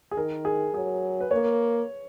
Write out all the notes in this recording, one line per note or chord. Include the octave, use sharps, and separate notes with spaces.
G#4
D#3 A#4
G#4
F#3 G#4
B4
A#3 C#5